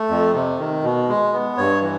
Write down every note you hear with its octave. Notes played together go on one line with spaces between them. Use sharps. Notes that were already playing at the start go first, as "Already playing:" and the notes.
Already playing: A3
F2
C3
D#3
B2
G#3
B3
G2 C#5
E3